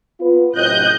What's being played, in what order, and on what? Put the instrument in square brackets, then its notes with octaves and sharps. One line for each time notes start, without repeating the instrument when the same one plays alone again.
[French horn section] B3 F4 B4
[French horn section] A2 C3 F#3 [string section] D#5 F#6 G6